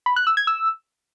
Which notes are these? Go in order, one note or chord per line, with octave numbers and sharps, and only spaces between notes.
B5
F#6
E6
G#6
E6